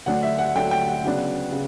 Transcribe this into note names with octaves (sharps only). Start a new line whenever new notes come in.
D2 D3 F#3 A3 D4 F#5
E5
F#5
D2 D3 F#3 A3 D4 G5
G5
F#5
C#3 F#3 B3 D4
C#3